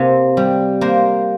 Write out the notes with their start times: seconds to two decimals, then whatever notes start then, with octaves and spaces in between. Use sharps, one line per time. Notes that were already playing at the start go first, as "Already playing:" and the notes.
Already playing: C3 A#3
0.37 G3
0.81 A#3 C5